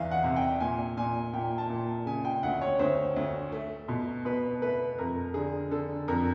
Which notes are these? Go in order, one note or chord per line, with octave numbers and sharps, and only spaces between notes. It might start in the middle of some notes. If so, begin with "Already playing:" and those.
Already playing: E2 E3 F5
F#5
C3
G5
A#2 G#5
A#2 G#5
A#2 G5
A5
A#2
C#3 G#5
G5
D2 F#5
C#5
D2 C5
D2
A3
B2
B2 B4
A3 B4
F2 A#4
D3 G#4
D3 A4
F2 A#4